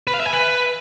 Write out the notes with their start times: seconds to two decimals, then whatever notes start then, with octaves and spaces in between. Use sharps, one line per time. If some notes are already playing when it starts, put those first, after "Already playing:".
0.07 B4
0.14 F5
0.20 E5
0.26 G#5
0.33 B4